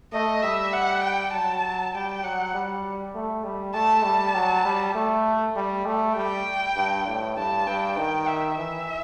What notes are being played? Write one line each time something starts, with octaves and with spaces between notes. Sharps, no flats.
A3 D#5
G3 E5
F#5
G5
F#3 A5
G3 G5
F#3 F#5
G3
A3
G3
A3 A5
G3 A5
F#3
G3
A3
G3
A3
G3 G5
G2
A2
G2 A5
G2 G5
D#3 G5
E5
E3 E5